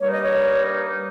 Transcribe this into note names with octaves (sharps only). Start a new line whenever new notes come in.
G2 G3 A#3 D#4 C#5
D#5
C#5